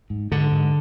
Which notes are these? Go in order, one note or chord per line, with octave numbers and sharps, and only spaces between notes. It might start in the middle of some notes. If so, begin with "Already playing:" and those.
G#2
G#2 D3
G#2